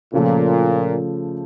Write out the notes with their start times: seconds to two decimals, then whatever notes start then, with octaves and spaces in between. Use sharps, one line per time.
0.13 A#2 C#3 F3 A3